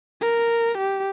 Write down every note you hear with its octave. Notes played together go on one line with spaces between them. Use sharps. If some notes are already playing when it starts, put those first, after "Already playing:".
A#4
G4